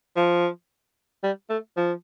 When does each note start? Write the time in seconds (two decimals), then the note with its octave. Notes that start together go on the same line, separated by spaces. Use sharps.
0.16 F3
1.23 G3
1.49 A3
1.77 F3